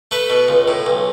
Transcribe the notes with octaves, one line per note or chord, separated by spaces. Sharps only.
A3 B4
B2
C#2
A2
B1